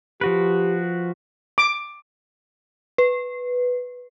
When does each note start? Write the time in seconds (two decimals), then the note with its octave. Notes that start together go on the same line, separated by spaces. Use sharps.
0.21 F3 F#4 G4 B4
1.58 D6
2.98 B4